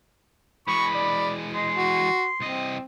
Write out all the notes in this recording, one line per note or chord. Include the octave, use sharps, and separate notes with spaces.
E3 G#3 B5 C#6
D5
D#5 C6
F#4
C2 C4 D#5